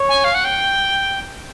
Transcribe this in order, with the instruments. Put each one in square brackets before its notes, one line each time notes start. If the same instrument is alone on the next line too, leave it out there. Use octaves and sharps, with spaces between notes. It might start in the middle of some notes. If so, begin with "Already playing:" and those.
Already playing: [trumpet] C#5
[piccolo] G#5
F5
F#5
G5